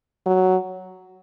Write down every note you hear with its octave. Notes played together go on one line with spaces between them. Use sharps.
F#3